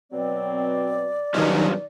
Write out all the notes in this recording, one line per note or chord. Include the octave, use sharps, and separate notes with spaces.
B2 F#3 C4 D5
G2 B2 D#3 F3 F#3 C#4 D#4 G4